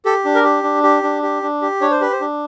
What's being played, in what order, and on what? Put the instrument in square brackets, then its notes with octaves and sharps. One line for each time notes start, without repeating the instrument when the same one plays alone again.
[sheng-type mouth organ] G4 A4
D4
A#4
G4
D4
G4
D4
G4
D4
G4
D4 C#5
C5
G4 B4
C5
D4